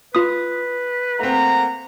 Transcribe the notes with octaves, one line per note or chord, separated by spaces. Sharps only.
F4 B4 D#6
A3 A#3 C4 F#5 A#5